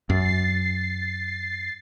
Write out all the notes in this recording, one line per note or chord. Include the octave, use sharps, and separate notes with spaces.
F#2 A6 C7